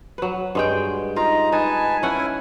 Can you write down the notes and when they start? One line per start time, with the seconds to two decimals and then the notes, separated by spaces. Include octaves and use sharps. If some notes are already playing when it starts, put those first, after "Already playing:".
0.18 F#3 B4
0.55 G2 G#3 G5
1.16 D#4 F4 A#5
1.52 D#4 B4 G#5 A5
2.03 C#4 E4 F#5 G#5